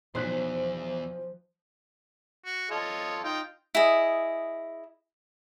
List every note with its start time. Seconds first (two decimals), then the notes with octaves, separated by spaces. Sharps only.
0.15 B1 E2 F3 C5 F#6 B6
2.45 F#4
2.71 F4 A4 C#5 D#5
3.24 D#4 F4 G5
3.75 E4 G#4 D#5